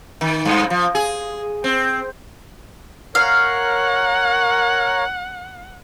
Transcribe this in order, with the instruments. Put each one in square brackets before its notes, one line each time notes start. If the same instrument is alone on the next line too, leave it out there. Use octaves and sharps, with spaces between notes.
[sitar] D#3
G2
F3
G#4
C4
[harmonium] A#4 C#5 [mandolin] F5 [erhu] F#5